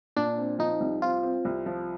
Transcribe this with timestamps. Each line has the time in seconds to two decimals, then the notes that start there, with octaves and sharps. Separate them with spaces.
0.16 A#2 D4
0.37 C4
0.59 F3 D#4
0.80 C2
1.02 C4 F4
1.23 C4
1.45 C2
1.66 F3